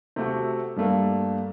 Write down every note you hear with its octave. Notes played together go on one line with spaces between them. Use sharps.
C3 A3 F#4
G2 G3 A3 A#3